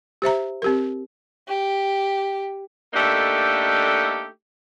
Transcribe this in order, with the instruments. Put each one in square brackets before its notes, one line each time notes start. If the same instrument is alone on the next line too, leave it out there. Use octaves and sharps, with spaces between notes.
[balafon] G4 C5 E5 A#5
C4 G4 A#4
[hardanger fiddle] G4
[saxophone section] A3 A#3 D4 D#4 G4 A4